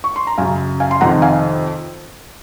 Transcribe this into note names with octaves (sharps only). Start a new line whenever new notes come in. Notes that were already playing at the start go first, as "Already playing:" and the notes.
C#6
C6
A#5
F#2 C#3 F5 G#5
F5 G#5
C6
F2 C3 D#3 F#5 A#5
F5 G#5